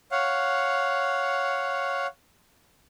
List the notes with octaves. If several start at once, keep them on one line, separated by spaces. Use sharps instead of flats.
C#5 F5 F#5